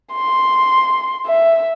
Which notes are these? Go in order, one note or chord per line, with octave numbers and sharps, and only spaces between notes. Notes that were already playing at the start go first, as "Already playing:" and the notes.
C6
E5